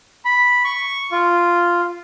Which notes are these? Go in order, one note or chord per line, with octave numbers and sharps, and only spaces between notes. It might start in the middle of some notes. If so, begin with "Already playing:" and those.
B5
C#6
F4